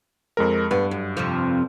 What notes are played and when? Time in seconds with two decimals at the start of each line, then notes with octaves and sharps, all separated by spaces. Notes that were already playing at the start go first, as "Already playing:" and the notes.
0.37 F2 G#3 A#4
0.71 G2 B3
0.91 F#2
1.17 F2 C3 F3